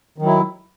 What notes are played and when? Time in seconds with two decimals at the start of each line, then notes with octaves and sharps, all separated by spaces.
0.18 D#3
0.22 F#3
0.26 E4